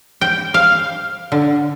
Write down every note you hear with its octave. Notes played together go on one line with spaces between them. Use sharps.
G5
F5
D3